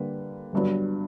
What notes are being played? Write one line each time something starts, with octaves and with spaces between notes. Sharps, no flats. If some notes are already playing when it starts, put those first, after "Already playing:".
Already playing: D3 G3 A#3 B4
G1 G2 F#3